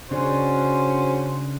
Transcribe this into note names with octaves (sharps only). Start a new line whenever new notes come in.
C#3 C#4 D4 F#4 G#4 C5 C#5